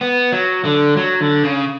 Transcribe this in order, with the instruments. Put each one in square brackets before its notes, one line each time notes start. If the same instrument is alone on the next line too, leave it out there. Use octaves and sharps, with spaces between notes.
[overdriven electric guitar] B3
F#3
D3
F#3
D3
C#3